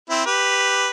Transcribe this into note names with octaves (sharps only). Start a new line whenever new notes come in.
C4 E4
G4 B4